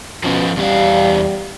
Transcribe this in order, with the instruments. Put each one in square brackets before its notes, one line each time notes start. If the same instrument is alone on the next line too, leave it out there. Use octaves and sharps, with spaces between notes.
[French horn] B2 [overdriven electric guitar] F3 C#4
[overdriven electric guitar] E2 F5 [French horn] G3